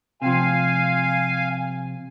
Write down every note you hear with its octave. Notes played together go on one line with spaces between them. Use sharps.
C3 F3 F5 G#5